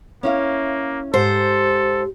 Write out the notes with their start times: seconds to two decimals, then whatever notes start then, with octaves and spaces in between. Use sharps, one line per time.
0.23 A#3 C#4 E4 F5
1.14 G#2 G4 A4 C5